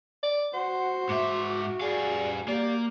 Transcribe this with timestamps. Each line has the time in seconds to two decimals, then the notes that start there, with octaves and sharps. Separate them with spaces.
0.23 D5
0.53 F#4 C5 F#5
1.09 G#2 E5 D6
1.81 G3 G#4 D5 F5
2.48 A#3 G4 D5